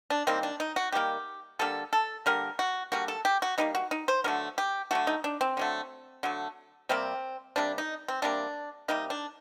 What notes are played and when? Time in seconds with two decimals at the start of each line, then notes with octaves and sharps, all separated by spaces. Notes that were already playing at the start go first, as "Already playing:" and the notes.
0.10 D4
0.27 D#3 G3 A#3 C4
0.43 D4
0.60 D#4
0.76 F#4
0.92 D#3 G3 A#3 G4
1.59 D3 G3 A#3 A4
1.93 A4
2.26 D3 G3 A#3 A#4
2.59 F#4
2.92 D3 G3 A#3 F#4
3.08 A4
3.25 G4
3.42 F#4
3.58 D3 G3 A#3 D#4
3.75 F#4
3.91 D#4
4.08 C5
4.24 D3 F#3 A3 A#4
4.58 G4
4.91 D3 F#3 A3 F#4
5.07 D#4
5.24 D4
5.41 C4
5.57 D3 F#3 A3
6.23 D3 F#3 A3
6.89 C3 G3 A#3 C4
7.56 C3 G3 A#3 D4
7.78 D#4
8.08 C4
8.22 C3 G3 A#3 D4
8.88 C3 G3 A#3 D#4
9.10 D4